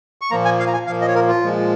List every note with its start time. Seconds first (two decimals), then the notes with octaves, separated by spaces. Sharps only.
0.21 C#6
0.31 A#2 F3 A#3 A#5
0.45 G#5
0.60 F5
0.67 A#5
0.74 G#5
0.87 A#2 F3 A#3 F5
1.01 D#5
1.08 C#5
1.15 A#4
1.28 F4
1.42 A#2 F3 G#3